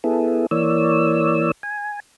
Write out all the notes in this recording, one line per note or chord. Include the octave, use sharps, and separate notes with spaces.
B3 E4 G#4 A4
E3 A#3 C#5 D5 E6
G#5